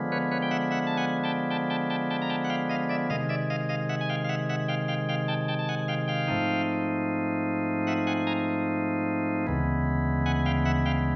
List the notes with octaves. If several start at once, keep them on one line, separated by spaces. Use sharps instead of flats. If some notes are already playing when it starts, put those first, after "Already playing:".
Already playing: D3 F3 G#3 B3
B4 C#5
B4 C#5
G5
E5 F#5
E5 F#5
A5
F#5 G#5
G5 A5
G5 A5
G5 A5
G5 A5
G5 A5
A#5
G5 A5
F#5
F5 G5
D#5 F5
D5 E5
C3 D#3 G#3 D#5 F5
D5 E5
D#5 F5
D#5 F5
E5 F#5
G#5
F5 G5
F5
E5 F#5
E5 F#5
F5 G5
F5 G5
F5 G5
G5 A5
G5 A5
A5
F#5 G#5
F5 G5
F5 G5
G#2 F3 A3 C4 D#4
E5 F#5
F#5 G#5
G#5 A#5
D2 C#3 E3 G#3 B3
F#5 G#5
F5 G5
E5 F#5
F5 G5